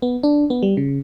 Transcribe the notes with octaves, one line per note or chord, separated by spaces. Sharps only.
B3
D4
B3
G3
C#3